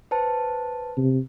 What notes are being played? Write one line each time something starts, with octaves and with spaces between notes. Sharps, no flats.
B4 C5 A5
C3